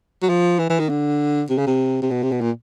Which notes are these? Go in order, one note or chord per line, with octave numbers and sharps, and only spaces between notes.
F#3
F3
E3
E3
D#3
D3
C3
C#3
C3
C3
B2
C3
B2
A#2